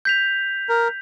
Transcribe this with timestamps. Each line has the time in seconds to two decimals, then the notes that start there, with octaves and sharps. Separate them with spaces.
0.05 G6 B6 F7
0.69 A#4